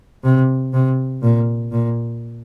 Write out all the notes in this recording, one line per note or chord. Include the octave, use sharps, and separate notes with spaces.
C3
C3
A#2
A#2